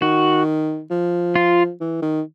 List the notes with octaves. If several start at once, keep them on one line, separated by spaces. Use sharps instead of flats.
D#3 F#4
F3
F4
E3
D#3